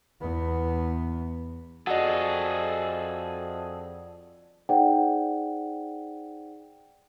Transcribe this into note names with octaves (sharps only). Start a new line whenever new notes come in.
E2 B3
F2 F#4 G#4 A4 D5 D#5 F#5
D#4 G#4 C5 D5 F#5 G5